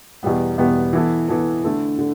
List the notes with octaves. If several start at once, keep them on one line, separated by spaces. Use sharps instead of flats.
E2 B2 G3 B3
E2 B2 G3 B3
E3 B3 E4 A4
E3 B3 E4 A4
D3 A3 E4 A4
D3